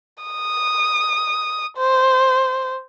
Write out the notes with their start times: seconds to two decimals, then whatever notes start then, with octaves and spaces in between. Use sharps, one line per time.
0.23 D#6
1.77 C5